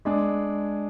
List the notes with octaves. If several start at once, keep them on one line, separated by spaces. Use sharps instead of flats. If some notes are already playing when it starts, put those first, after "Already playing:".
G#3 D4 G#4